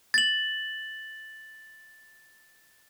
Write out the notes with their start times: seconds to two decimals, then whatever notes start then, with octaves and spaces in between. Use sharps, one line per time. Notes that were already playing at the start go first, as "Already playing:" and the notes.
0.14 A6 F#7